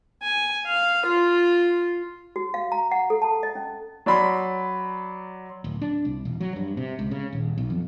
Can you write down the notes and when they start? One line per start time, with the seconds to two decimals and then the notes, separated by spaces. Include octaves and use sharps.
0.22 G#5
0.66 F5
1.06 F4
2.36 F#4
2.54 F5
2.72 A#5
2.91 F#5
3.10 A4
3.22 A5
3.43 D#5
3.55 C#4
4.06 F#3 D5 B5 C6
5.64 D1
5.82 D4
6.05 C2
6.25 E1
6.40 F#3
6.56 G2
6.77 C3
6.99 C#2
7.11 C#3
7.33 D#1
7.58 B1
7.70 F2